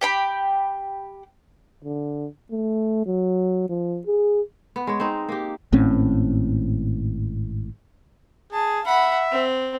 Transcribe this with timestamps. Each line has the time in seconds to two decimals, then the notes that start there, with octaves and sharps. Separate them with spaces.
0.01 G4 G5 B5
1.84 D3
2.51 A3
3.06 F#3
3.69 F3
4.06 G#4
4.76 B3
4.87 G#3 C#5
5.00 C4 D#4
5.29 A#3 G4
5.72 G#1 A2 C4 C#4
8.53 G#4 A5
8.85 E5 F#5 B5
9.31 C4